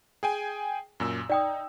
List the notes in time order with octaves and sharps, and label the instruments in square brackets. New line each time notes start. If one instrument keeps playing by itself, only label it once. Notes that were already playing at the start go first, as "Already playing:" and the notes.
[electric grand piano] G#4 G5 G#5
F#2 A#2 E6
[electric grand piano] D#4 [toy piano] D5 G5 D#6